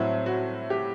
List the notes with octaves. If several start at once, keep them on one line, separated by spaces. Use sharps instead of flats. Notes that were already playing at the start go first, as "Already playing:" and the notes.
Already playing: A2 F#3 C4 E4
F#4
G4